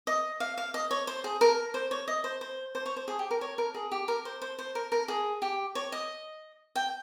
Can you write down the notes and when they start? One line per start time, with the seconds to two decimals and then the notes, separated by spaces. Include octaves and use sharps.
0.07 D#5
0.40 F5
0.57 F5
0.74 D#5
0.91 C#5
1.07 C5
1.24 G#4
1.41 A#4
1.74 C5
1.91 C#5
2.08 D#5
2.24 C5
2.41 C5
2.75 C5
2.86 C#5
2.96 C5
3.08 G#4
3.19 G4
3.31 A#4
3.41 C#5
3.58 A#4
3.74 G#4
3.92 G4
4.08 A#4
4.25 C5
4.42 C5
4.58 C5
4.75 A#4
4.92 A#4
5.08 G#4
5.42 G4
5.75 C#5
5.92 D#5
6.76 G5